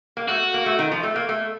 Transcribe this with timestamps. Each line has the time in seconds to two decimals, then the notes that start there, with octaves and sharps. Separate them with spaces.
0.17 A#3
0.28 A3 F#4
0.54 A#3
0.66 A3
0.79 D#3
0.91 F3
1.03 A3
1.15 A#3
1.29 A3